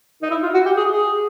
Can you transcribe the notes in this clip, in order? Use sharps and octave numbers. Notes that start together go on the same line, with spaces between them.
D#4
E4
F4
F#4
G4
G#4
G#4